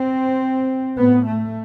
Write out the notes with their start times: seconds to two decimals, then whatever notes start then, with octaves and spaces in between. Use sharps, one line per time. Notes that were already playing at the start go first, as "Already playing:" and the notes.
Already playing: C4
0.97 A2 B3
1.26 A3